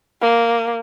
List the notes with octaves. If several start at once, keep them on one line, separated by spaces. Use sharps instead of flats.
A#3